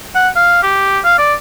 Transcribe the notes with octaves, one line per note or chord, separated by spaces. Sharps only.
F#5
F5
G4
F5
D5